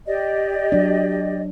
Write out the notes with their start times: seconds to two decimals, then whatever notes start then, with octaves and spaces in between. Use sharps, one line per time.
0.07 G4 D5 D#5
0.72 F#3 D4